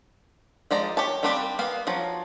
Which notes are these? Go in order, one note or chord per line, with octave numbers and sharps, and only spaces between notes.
F3 G#3 D5 A#5
G4 C#5 A5
G3 A#3 C4 D4 G4
A#3 B3 F5
F3 F#3